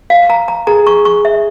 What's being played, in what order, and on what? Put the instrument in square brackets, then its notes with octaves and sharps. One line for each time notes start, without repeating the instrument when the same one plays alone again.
[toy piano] F5
A#5
A#5
[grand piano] G#4 [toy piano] A#5
[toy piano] C#6
C#6
E5